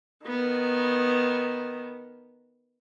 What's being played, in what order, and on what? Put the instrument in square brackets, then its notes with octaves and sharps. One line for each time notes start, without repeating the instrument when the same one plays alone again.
[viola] D#3 B3